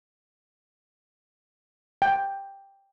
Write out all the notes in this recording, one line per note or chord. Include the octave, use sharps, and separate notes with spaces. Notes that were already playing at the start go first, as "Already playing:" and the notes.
G5